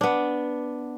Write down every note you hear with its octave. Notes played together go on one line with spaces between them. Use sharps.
B3 D4